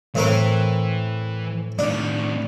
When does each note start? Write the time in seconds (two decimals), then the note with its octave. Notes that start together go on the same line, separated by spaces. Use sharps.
0.15 A2 E3 C4 A#4
1.79 A2 D#3 D4